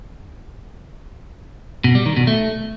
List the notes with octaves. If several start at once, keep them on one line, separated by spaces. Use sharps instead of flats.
B2
G3
D#3
B2
A3